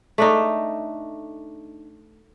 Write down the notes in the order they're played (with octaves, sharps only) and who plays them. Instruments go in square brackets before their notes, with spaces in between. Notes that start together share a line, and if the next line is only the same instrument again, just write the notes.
[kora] A3 D4 D#4